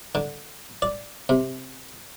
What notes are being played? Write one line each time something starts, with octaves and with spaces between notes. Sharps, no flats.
D3
D5
C3